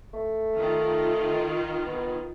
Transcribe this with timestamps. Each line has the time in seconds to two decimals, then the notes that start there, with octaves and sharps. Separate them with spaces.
0.14 A3
0.56 D#3 F4
1.86 B3